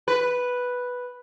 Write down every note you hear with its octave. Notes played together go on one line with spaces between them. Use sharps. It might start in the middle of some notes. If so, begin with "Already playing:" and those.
B4